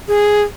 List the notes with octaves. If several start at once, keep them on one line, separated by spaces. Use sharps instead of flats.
G#4